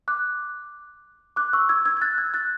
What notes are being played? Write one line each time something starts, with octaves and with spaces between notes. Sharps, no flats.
D6 F#6
D6 F#6
C#6 E6
E6 G#6
E6 G#6
G#6
F#6 A6
E6 G#6
F#6 A6